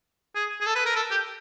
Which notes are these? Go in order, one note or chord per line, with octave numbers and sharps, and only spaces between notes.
G#4
G#4
A4
B4
A#4
A4
G4